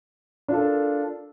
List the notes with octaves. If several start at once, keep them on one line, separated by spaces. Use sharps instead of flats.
D4 F4 A4 A#4